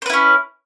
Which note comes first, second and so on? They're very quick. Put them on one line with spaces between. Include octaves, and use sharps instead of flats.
C5 B4 E4 C#4